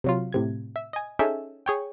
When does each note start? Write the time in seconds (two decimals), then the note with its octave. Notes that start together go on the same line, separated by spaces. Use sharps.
0.04 C3 F#3 F4
0.33 A2 C3 G#6
0.76 E5
0.93 D#5 G#5
1.19 C#4 D#4 G#4 A4 E5 G5
1.66 G#4 C#5 G5